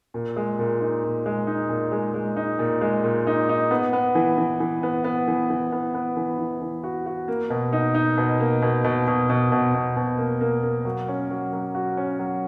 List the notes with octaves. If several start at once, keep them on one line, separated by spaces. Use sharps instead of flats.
A#2
G#3
A#2
D#4
A#2
G#3
D#4
A#2
G#3
G#3
D#4
A#2
G#3
A#2
D#4
D#4
B3
B3
E3
E3
E3
B3
B3
E3
E3
B3
B3
E3
E3
E3
F#4
F#4
A#3
B2
D#4
D#4
B2
A#3
B2
B2
B2
B2
B2
B2
B2
A#3
A#3
A#3
F#3
C#4
F#3
F#3
F#4
C#4
F#3